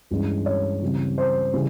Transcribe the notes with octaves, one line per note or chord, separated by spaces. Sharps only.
G2 E3 G#3 C#4
C#5
C#3 E3 G3 C4
C5
C#3 E3 G3